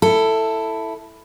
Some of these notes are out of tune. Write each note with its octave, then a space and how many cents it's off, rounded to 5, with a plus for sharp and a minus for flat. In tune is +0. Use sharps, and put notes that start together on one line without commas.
E4 +0 A4 +10